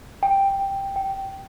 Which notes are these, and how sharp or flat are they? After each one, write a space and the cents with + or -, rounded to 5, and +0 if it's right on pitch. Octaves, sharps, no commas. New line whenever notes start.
G5 +5
G5 -15